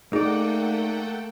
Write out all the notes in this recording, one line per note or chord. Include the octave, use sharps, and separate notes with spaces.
A3 A#3 D#4 G#4 A4 D5 F#5 G5